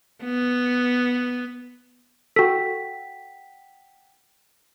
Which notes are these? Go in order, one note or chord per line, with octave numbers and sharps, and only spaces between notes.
B3
F#4 A4 F#5 G5 B6